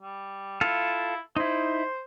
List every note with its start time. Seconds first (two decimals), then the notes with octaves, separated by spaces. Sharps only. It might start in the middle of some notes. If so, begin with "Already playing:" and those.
0.02 G3
0.61 E4 F4 A4 F5
1.36 D#4 E4 C5